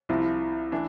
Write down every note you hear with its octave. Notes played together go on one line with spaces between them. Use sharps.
C2 C3 F3 E4
E3 A3 D4